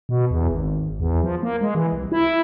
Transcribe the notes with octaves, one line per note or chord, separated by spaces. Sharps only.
B2
E2
G#1
E2
F3
A#3
G#3
E3
C2
E4